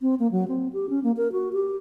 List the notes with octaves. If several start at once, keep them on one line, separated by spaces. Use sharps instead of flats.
C4
A#3
F#3
C4
G4
C#4
A#3
A#4
F#4
G4